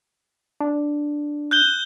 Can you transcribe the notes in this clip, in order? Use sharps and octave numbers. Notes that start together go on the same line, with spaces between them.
D4
F#6 G6 G7